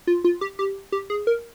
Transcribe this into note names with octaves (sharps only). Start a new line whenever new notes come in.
F4
F4
G4
G4
G4
G#4
A#4